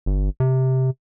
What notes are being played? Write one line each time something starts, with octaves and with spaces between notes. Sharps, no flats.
G1
C3